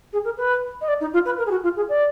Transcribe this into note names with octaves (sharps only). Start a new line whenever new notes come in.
G#4
A#4
B4
D#5
D5
D#4
F4
B4
A#4
G#4
F#4
F4
G#4
D5